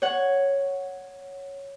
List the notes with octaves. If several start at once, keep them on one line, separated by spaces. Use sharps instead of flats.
C#5 F#5